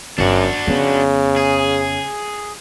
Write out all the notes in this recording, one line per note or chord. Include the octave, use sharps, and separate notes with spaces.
G1 F#2 D4 F#4
F2 C#3 B3
G#4